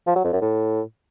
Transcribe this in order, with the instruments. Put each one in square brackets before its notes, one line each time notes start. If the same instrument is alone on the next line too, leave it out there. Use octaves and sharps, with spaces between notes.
[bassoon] F3
F#3
F2
F#2
A2